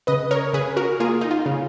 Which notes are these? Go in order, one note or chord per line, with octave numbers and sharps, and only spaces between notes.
C#3 B4 D#5
A#4 C#5
C#3 G#4 B4
F#4 A#4
A#3 F4 G#4
D#4
F4
C#3